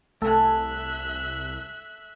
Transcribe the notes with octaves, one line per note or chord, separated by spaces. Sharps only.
C2 A3 A4 E5 G#5 F#6